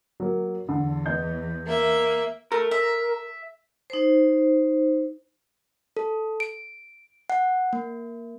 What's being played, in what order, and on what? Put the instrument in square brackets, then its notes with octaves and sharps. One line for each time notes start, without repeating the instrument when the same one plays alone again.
[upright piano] F#3 A#3
[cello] E2 [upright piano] D3
[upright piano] B3 D#5 G6
[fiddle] A#3 E5
[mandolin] A3 [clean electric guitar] A#4
[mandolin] E5
[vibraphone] D#4 C5
[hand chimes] A4
D7
F#5
A#3